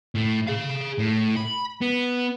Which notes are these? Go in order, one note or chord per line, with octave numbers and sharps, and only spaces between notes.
A2
G#4 F5
A2
B5
B3